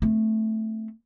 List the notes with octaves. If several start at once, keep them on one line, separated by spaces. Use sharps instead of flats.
A3 C4